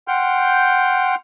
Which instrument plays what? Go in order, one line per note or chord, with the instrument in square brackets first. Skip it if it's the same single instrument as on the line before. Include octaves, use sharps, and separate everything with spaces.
[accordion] F#5 G5 C6 F6 G6